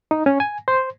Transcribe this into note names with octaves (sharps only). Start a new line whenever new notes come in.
D#4
C#4
G#5
C5